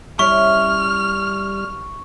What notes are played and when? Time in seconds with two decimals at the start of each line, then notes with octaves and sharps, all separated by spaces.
0.19 G3 C#4 E4 C#6 F6